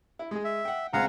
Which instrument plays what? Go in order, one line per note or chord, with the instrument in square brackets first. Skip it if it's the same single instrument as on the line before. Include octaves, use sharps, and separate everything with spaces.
[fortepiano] E4
G#3 G#4
[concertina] E5
[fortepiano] F#5 G5
[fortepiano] C#2 G#3 C4 [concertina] F5 F#5 A#5